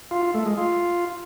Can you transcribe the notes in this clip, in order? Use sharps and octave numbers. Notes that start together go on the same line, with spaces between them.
F4
F4
A3
G#3
F4